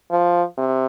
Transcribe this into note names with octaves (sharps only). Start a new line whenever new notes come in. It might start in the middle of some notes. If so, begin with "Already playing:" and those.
F3
C3